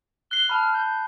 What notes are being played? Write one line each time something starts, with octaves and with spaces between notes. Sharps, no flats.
F#6 C7 G7
A5 B5 F6
G6